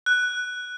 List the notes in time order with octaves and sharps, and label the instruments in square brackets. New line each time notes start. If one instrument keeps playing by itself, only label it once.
[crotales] F#6